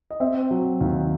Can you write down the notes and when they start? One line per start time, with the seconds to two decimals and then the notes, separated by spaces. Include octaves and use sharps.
0.11 D#5
0.20 C4 E5
0.51 F#3
0.80 D#2